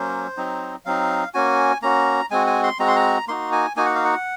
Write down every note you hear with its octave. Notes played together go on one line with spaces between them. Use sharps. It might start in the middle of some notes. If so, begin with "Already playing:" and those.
Already playing: F#3 A#3 C#4 C5
F#3 C4 D#4
F#3 C4 D#4 F5
A#3 C#4 F#4 G#5
A#3 C#4 F#4 A#5
G#3 C4 F#4 G#5
G#5
C6
G#3 C4 F#4 A#5
C6
A#5
A#3 D#4 F#4 C6
G#5
A#3 D#4 F#4 G#5
F#5
F5
F#5